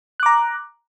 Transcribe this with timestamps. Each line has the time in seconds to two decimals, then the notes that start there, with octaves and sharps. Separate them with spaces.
0.20 F#6
0.23 D6
0.26 A#5